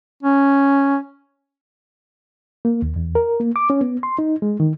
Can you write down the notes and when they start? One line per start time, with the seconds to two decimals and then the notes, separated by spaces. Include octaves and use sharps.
0.23 C#4
2.65 A#3
2.82 D#2
2.96 E2
3.15 A#4
3.40 A#3
3.56 D6
3.70 C#4
3.81 B3
4.03 C6
4.19 D#4
4.42 G#3
4.60 D#3